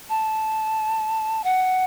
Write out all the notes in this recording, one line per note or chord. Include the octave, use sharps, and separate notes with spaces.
A5
F#5